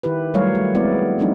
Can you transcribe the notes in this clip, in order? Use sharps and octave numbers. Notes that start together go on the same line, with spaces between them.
D#3 E4 G4 B4
F#3 G3 A3 A#4 C#5 F5
G3 A3
G#3 B3 C4 E4 D5
F3 G3 A3 C4 D4 D#4